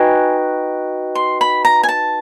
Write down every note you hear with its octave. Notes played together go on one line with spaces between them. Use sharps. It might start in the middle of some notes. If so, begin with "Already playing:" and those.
Already playing: D#4 F#4 B4 D#5 G5 G#5
C6
B5
A#5
G#5
A5